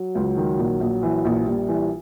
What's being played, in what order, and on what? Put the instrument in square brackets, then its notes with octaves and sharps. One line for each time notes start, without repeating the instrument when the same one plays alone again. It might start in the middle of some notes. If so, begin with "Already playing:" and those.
Already playing: [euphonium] F#3
[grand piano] C#2
D#3
A#1
A#1
E3
A#1
[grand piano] A#1 [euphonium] G3
[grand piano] E3